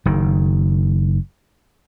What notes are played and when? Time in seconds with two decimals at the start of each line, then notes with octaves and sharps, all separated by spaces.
0.05 F#1 D#3